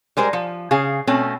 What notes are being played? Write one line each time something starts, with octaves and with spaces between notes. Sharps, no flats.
G3 G#3 A#4 C5
F3
C#3 G#4 F5
B2 A3 C4 C#4